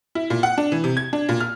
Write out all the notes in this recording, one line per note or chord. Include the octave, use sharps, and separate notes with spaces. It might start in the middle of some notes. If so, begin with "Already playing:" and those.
E4
A#2
F#5
D4
E3
C3
G#6
D4
A#2
F6